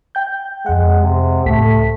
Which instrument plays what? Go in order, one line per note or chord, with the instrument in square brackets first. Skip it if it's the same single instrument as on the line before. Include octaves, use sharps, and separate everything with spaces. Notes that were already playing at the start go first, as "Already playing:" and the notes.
[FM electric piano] G5 G6
[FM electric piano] F2 F#5 [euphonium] G#3
[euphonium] C3
[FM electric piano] C#2 A2 B6 [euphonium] A3